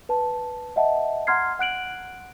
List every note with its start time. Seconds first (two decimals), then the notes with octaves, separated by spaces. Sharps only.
0.09 B4 A5
0.76 D#5 E5 F#5 A5
1.27 F#5 A#5 C6 F6 G#6 C7
1.59 F#5 F#6 D7 F#7